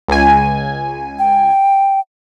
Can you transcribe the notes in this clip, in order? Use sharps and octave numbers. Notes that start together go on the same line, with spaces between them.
C#2 G#5
G5